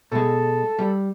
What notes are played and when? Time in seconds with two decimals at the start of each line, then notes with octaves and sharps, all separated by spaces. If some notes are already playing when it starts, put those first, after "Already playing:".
0.12 B2 G#3 A4
0.79 G3